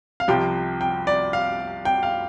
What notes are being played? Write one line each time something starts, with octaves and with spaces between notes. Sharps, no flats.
F5
C2 C3 F3 G5
G5
D5
F5
G5
F5